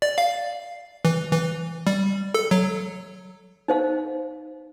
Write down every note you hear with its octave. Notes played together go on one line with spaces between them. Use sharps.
D5
F5
E3
E3
G3
A4
F#3
D#4 C5 F5